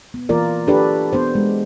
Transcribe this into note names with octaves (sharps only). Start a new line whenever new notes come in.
B3
E3 A#3 F4 A#4 D5
D4 F#4 G4 A4 B4 D5
B3 D4 C5
G#3